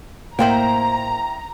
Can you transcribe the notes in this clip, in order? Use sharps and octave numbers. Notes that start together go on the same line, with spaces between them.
A2 A#3 E4 C5 F5 G5 A#5